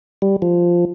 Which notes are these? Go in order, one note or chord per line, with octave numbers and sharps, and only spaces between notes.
G3
F3